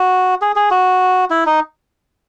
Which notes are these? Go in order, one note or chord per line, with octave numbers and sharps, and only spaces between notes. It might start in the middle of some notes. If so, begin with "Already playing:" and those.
Already playing: F#4
G#4
G#4
F#4
E4
D#4